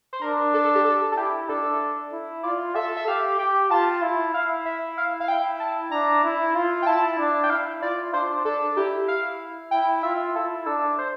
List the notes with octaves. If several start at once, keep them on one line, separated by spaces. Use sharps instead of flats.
C5
D4 A#4
A4
A4
G4
A4
A4
E4 G4
D4 A4
E4
F4 D5
A4 E5
E5
G4 F5
G4 G5
F4 A5
E4
E4 F5
E5
F5
F5
E4 G5
A5
D4 A#5
E4
F4
G5
E4 A5
D4
G5
E4 F5
F4 D5
D4 C5
D4 A4
E4 G4
F5
E4 G5
F4 E5
E4 A4
D4 A4
C5